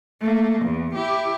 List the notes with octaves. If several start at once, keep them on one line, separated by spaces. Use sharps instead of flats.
A3 A#3
E2
E4 G4